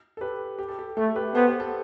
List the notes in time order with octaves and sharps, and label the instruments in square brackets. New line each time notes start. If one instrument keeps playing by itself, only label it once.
[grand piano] A4
G4 B4
G4
A4
G4
[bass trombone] A3 [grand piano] A4
[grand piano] G4 B4
[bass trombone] B3 [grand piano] A4 C5
[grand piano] G4
A4